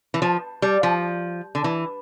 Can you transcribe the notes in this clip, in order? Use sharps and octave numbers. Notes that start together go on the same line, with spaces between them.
E3
F3
G3
F3
D3
E3